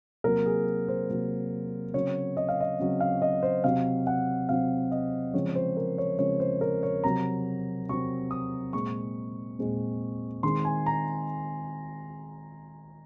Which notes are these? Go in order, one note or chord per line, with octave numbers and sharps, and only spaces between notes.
C3 F#3 A#3 A#4
G#4
C5
C3 F#3 A#3
C#3 F#3 C4 C#5
D#5
F5
D#5
C#3 F#3 C4
F5
D#5
C5
C3 F#3 C4 F5
F#5
C3 F#3 C4 F5
D#5
C#3 F3 G#3 C4 C#5
C#5
C5
A#4
C#5
C#3 F3 G#3 C4 C#5
C5
A#4
C#5
C3 F#3 C4 A#5
C3 F#3 C4 C#6
D#6
A#2 G#3 C4 C#6
A#2 G#3 C4
D#3 G#3 C4 C6
G#5
A#5